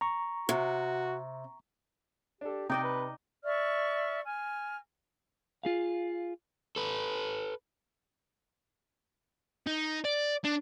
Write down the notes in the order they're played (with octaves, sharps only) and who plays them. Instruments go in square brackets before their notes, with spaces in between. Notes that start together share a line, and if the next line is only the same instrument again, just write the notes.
[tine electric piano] A#5 C#6
[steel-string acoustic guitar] C3 [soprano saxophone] F#4
[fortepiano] D4 A4 [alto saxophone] G4
[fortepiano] C3 [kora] D#4 D5 D#5 [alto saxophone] G5
[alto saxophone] B4
[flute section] D5 E5 C#6 F6
G#5 F6
[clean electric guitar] F4 G#4 F5
[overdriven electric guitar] A4 B4
[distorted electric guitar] D#4
D5
D4